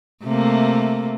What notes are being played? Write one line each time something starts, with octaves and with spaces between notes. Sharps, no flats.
C3 A3 A#3